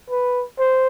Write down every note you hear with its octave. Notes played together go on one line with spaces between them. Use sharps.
B4
C5